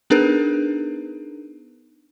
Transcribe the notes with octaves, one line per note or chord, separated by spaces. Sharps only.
B3 D4 D#4 G#4 A#4 B4